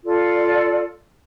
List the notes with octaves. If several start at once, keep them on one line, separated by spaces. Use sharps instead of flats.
F4 A4 D5